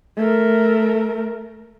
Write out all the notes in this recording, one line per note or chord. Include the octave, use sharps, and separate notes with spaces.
A3 A#4